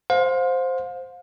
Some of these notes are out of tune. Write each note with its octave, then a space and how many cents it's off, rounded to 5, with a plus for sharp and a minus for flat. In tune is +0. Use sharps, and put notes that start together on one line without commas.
C5 +0 F5 +35